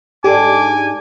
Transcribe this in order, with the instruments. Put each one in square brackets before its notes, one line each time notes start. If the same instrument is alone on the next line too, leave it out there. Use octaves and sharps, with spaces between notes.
[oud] G#2 G#3 D4 [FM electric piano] G4 A4 [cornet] G#5 [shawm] D6